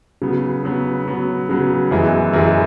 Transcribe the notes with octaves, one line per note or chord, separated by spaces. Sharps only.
C#3 F#3 B3
C#3 F#3 B3
C#3 F#3 B3
C#3 F#3 B3
F#2 E3 G#3
F#2 E3 G#3